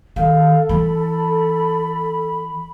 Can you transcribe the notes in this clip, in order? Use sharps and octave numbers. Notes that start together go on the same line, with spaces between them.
D#3 A4 F5
E3 B5